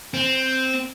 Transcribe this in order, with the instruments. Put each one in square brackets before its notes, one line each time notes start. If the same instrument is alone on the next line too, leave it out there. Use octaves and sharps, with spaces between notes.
[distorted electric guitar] C4